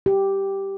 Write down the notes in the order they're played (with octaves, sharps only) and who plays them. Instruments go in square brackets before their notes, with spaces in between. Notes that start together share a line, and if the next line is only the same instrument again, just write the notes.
[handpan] G4